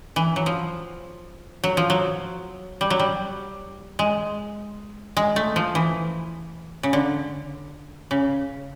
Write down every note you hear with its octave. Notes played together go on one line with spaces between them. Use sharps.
E3
F#3
F3
F#3
F3
F#3
G3
F#3
G3
G#3
G#3
A3
F3
E3
C#3
D3
C#3